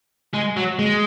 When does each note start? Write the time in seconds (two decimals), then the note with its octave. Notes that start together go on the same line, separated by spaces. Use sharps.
0.33 G#3
0.57 F#3
0.79 G#3